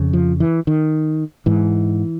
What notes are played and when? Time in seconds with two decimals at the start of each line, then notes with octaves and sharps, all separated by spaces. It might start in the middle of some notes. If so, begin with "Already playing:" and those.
Already playing: F2 C#3
0.13 F3
0.40 E3
0.67 D#3
1.46 G#2 E3